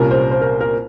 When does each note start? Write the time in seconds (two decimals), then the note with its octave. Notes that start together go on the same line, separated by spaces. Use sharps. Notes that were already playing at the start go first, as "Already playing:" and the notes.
Already playing: C2 A#2 G3 C#4 F4 A#4
0.11 C5
0.31 C5
0.41 A#4
0.61 A#4